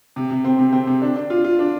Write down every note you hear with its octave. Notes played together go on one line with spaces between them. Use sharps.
C3
C3
C4
C3
C4
C3
D4
D4
F4
F4
D4